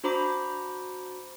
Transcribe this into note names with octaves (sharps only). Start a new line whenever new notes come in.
D4 F#4 C5 A#5 B5 D6